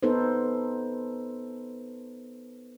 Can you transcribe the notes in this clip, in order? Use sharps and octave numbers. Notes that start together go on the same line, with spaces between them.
B3 D#4 A4 B4 C5